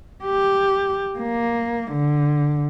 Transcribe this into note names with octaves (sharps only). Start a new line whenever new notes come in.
G4
A#3
D3